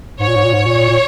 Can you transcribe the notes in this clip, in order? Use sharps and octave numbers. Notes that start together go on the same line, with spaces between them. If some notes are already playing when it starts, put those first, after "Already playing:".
G#2 C#5
A#2
G#2
A#2
G#2
A#2
A#2